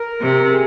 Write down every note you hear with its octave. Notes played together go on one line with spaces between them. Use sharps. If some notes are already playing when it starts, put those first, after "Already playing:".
Already playing: A#4
C3
G#4